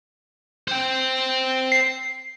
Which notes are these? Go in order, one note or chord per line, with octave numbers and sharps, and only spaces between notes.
C5 G5
C7